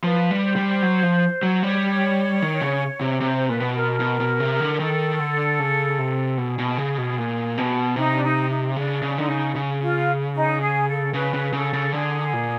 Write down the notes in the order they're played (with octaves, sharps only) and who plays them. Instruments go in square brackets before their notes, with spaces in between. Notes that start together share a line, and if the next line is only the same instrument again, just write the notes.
[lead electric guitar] F3 [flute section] B4
[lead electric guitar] G3
[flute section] C5
[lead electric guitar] G3
F#3
F3
F#3
[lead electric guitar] G3 [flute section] C#5
[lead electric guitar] D#3
C#3
C3
[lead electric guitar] C3 [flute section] C5
[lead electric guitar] A#2 [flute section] B4
[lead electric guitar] B2
[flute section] A#4
[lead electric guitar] B2
B2
C3
D3
[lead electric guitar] D#3 [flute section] A4
[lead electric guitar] D3
C#3
C3
[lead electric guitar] B2 [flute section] G#4
[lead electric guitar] B2
C#3
B2
A#2
B2
[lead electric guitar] C3 [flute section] D#4
[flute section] D4
D#4
D#4
[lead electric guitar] C#3 [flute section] D4
[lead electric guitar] C#3
[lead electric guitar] D3 [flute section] D#4
[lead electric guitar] C#3
C#3
[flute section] F4
D#4
G#4
A4
[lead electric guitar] C#3 [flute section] B4
[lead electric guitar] C#3
[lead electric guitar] C#3 [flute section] A4
[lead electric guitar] C#3
[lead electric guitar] D3 [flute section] G#4
[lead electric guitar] A#2